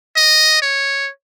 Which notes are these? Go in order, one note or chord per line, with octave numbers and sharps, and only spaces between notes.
D#5
C#5